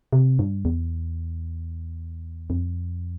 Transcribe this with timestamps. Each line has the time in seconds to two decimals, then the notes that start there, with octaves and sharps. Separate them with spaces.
0.13 C3
0.39 G2
0.65 E2
2.50 F2